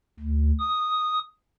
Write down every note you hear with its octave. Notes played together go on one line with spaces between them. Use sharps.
D2
D#6